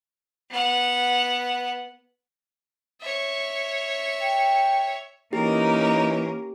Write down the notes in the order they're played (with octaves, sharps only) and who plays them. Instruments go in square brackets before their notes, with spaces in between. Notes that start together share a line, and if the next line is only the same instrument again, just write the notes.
[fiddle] B3 F#5
C#5 E5
[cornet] G5
[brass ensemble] E3 D#4 [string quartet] A#3 C#4 A#4 [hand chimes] G4